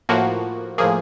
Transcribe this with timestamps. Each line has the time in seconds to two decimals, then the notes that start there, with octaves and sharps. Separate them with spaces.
0.09 A2 F3 A#3 F#4
0.78 A2 F3 A#3 G#4